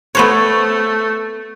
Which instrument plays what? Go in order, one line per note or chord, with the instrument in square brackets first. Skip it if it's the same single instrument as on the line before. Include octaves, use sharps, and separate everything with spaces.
[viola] A3 [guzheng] B3 C5 C#5